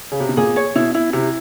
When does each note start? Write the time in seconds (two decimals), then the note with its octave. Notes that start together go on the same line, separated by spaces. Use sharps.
0.12 C#3
0.20 C3
0.29 B2
0.37 A#2 G#4
0.56 C#5
0.76 B2 E4
0.94 E4
1.13 C3 E4